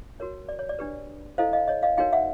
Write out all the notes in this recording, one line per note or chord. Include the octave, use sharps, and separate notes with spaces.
F#4 A#4 C#5
D5
C#5
D5
D4 G4 B4
E4 A4 C5 D#5 F5
D#5 F5
C#5 D#5
D#5 F5
D#4 F#4 A#4 C#5 F5 G5
E5 F#5